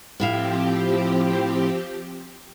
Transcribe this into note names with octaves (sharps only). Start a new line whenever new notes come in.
A2 F3 C4 E4 G4 F5